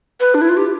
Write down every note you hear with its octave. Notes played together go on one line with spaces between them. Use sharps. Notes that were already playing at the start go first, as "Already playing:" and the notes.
B4
D4
E4
F4
G4